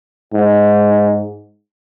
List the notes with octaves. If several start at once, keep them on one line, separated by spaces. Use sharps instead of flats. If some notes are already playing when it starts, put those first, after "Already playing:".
G#2